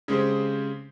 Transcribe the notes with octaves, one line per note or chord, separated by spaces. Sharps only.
C#3 G#3 C4 G4 C5